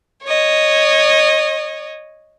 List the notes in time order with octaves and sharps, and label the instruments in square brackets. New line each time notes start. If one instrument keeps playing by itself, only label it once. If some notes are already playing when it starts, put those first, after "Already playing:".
[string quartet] C#5 D#5